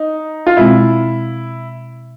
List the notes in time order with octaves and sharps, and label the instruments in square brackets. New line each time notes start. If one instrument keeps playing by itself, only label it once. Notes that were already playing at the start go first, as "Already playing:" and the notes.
Already playing: [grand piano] D#4
F4
[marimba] B2 G#3 C4 [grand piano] E4